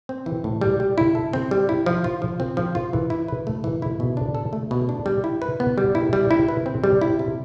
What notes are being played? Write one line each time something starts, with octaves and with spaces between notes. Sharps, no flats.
C4
E3
A2
G3
G3
E4
A4
C4
G3
E4
F3
F4
F3
C4
F3
F4
E3
E4
B4
A3
E3
E4
B2
D4
A4
A3
B2
D4
G3
E4
B4
B3
G3
E4
G3
E4
B4
C4
G3
E4
C3